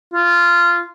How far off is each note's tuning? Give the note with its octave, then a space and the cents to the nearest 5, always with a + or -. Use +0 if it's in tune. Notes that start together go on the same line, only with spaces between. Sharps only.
F4 -15